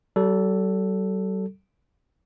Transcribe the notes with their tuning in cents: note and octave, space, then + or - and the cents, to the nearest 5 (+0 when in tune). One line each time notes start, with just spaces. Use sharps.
G3 -45 A4 +0